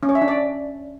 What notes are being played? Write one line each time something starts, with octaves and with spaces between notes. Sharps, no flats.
C#4
C#5
E5
D4
D5